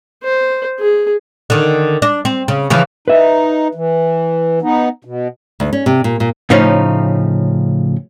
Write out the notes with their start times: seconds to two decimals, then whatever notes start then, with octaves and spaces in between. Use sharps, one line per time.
0.24 C5
0.79 G#4
1.50 D3 D#3
2.02 D4
2.25 C4
2.48 C#3
2.70 C#3 E3 F3
3.08 D#4 B4 E5
3.75 E3
4.62 B3 D#4
5.05 B2
5.60 D2
5.73 C#4
5.86 C3
6.04 A#2
6.20 A#2
6.50 A2 C#3 F3 C#4 D#4